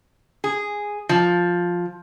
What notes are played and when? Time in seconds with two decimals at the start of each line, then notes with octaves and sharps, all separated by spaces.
0.44 G#4
1.09 F3